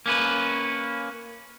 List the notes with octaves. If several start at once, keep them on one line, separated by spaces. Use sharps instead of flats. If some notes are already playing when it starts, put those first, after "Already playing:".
A#3 C#4 B4